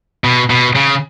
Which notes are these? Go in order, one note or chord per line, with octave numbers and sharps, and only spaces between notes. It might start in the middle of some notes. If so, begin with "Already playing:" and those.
B2
B2
C#3